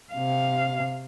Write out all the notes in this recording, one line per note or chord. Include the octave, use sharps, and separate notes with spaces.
C3 F5